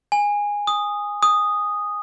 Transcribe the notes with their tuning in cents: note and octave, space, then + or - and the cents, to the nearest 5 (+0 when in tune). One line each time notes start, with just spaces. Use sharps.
G#5 -15
D#6 -5
D#6 -5